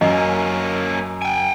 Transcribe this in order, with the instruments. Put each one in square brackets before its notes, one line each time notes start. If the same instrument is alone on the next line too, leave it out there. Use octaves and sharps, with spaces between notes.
[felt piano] F#2 [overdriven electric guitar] A#3 C#4 [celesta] D#5
[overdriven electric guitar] G5 G#5